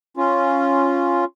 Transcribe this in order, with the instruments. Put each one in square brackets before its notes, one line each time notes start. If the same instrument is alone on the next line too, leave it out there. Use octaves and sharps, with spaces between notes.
[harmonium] C#4 F4